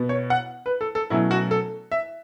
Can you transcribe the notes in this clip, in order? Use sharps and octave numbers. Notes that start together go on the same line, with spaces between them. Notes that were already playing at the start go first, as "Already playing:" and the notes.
Already playing: B2 B3
C#5
F#5
B4
A4
A4
B2 F#3 A3 C#4 E4
F#4
A4
E5